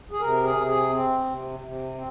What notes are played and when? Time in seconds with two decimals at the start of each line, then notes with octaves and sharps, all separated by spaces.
0.11 G#4
0.21 C3 A#4
0.44 G#4
0.56 C3
0.67 G#4
0.90 C4
1.25 C3
1.60 C3
1.94 C4